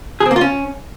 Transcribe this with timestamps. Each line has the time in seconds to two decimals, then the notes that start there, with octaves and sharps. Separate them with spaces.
0.20 G#4
0.26 C4
0.31 A#3
0.36 F4
0.41 C#4